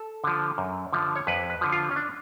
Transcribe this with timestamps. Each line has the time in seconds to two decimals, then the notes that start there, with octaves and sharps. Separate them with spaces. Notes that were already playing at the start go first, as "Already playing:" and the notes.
Already playing: A4
0.24 D3 F3
0.58 F#2
0.93 D3 F3
1.16 C#5
1.27 F2 B4
1.50 B4
1.61 D3 F3
1.72 F4
1.91 C#4
1.96 D4